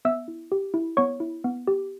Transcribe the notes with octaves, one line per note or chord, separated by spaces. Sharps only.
B3 E5 E6
E4
G4
E4
B3 C#5 C#6
E4
B3
G4